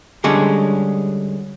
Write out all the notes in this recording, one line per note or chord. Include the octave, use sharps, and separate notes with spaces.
D3 G3 G#3 C#4